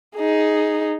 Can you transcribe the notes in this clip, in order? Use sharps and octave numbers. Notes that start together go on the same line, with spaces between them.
D#4 G#4